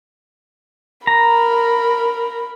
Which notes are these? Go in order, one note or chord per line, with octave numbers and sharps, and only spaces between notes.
A#4 A#5 B5